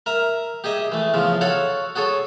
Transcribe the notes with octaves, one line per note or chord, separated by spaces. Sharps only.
A#4 E5 A#5
G4 G#4 D#5 E5
E3 A3
E2 C#3 F3
F#4 A4 C#5 F5 F#5
F#4 G#4 A4 C#5